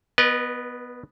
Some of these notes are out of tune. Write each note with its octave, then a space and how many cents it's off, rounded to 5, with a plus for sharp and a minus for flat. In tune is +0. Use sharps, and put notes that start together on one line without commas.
B3 +0 B4 -45 D#5 -30